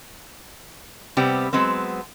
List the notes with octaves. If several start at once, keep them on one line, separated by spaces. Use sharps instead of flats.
C3 G3 B3 C4 G4
F#3 G#3 B3 C4